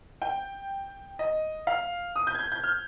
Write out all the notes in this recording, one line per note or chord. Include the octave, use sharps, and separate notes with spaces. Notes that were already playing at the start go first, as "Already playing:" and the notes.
G5
D#5
F5
D#6
G6
G#6
G6
G6
F6